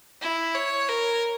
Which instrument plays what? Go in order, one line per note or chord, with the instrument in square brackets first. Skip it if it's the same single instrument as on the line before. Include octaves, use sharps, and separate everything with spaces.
[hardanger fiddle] E4
C#5
A#4